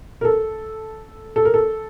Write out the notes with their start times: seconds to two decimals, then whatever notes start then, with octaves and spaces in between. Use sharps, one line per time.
0.21 A#4
0.25 A4
1.36 A4
1.45 A#4
1.54 A4